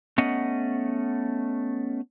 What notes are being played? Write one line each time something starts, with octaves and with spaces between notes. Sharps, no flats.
A3 B3 C#4 D#5 F#5